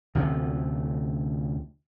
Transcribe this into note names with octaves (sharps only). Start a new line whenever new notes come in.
D2 C3 F3